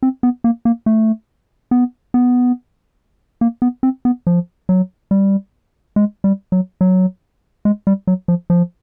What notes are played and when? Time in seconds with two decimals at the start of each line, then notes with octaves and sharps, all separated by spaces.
0.03 C4
0.23 B3
0.44 A#3
0.65 A#3
0.86 A3
1.71 B3
2.14 B3
3.41 A#3
3.62 B3
3.83 C4
4.05 B3
4.27 F3
4.69 F#3
5.11 G3
5.96 G#3
6.24 G3
6.52 F#3
6.81 F#3
7.65 G#3
7.87 G3
8.07 F#3
8.28 F3
8.50 F3